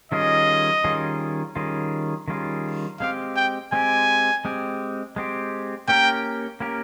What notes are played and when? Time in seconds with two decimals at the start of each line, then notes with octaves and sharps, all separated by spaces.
0.12 D#3 G3 C#4 F4 G#4 D#5
0.84 D#3 G3 C#4 F4 G#4
1.56 D#3 G3 C#4 F4 G#4
2.28 D#3 G3 C#4 F4 G#4
3.00 G#3 C4 G4 F5
3.36 G5
3.73 G#3 C4 G4 G#5
4.45 G#3 C4 G4
5.16 G#3 C4 G4
5.88 A#3 C#4 G4 A#4 G5
6.60 A#3 C#4 G4 A#4